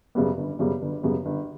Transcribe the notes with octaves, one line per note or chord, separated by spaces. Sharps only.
F#2 C#3 G3 B3
G1
F#2 C#3 G3 B3
G1
F#2 C#3 G3 B3
G1